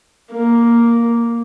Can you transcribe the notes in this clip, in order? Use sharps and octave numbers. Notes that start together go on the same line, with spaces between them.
A#3